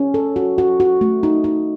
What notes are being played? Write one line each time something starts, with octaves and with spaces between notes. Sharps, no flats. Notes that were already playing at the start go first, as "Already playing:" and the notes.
Already playing: C#4
A4
F#4
F#4
F#4
A3
D#4
D#4